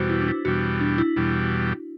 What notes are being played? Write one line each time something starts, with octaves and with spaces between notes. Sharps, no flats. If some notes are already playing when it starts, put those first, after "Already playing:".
Already playing: E2 B2 G3 F#4 B4 C5
E4
D4
E4
E2 B2 G3 F#4
D4
E4
E2 B2 G3